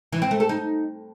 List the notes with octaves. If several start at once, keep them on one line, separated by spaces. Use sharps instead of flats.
E3
C4
A3
A4
D#4